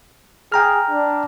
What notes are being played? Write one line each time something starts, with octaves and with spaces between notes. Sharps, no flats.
G#4 G5 A#5 F6
D4